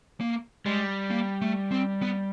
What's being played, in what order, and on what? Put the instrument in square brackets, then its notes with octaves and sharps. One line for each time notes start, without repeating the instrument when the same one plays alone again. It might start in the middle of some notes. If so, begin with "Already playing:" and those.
[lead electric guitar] A#3
[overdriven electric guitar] G3 [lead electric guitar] G#3
[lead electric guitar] A#3
A3
C4
B3